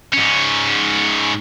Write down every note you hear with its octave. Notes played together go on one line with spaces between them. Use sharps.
G#2 C#4